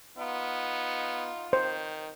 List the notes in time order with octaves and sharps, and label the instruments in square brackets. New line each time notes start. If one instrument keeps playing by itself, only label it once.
[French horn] B3 [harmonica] D#4 F4
[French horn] D#3 [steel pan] C5